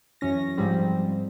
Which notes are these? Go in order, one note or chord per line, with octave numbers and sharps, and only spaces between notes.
F#2 E3 C#4 A#6
G#2 F3 G3 C4